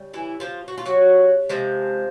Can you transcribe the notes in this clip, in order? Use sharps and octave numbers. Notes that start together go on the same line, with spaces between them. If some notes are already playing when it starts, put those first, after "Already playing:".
Already playing: C#3 G3
E3 E4
F3 F4
F#4
F4
F#3 F#4
C3 F3 G#3